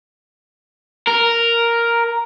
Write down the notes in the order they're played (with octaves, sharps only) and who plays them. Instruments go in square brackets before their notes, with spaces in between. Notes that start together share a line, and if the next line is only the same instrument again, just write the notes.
[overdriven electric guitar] A#4